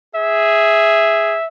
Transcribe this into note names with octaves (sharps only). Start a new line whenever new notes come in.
G#4 E5